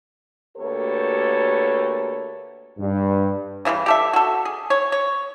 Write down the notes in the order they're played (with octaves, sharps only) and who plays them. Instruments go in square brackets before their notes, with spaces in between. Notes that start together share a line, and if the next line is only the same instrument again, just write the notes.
[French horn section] D2 A#3 G4 A4 B4 C#5
[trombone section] G2
[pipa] C#3 E3 F3 G3
G4 A4 E5
F#4 A4
G#4
C#5
C#5